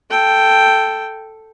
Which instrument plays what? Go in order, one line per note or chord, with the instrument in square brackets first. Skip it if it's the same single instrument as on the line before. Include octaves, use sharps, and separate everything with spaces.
[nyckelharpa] A4 G5